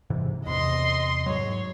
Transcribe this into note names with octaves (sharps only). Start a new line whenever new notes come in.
G#2 C3 E3
E2 C3 D#5 C6
G#2 F#3 C#5